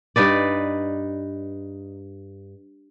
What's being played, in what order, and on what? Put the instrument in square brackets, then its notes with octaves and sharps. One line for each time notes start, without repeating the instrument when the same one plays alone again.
[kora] G2 D#4 B4 D5